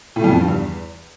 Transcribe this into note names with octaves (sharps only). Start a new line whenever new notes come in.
A2
F2
F3
G2
E2